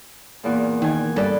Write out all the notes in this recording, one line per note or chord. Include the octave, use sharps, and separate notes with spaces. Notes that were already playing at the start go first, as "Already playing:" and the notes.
E2 A#2
D#3 G5 G#5
G2 A4 B4 D5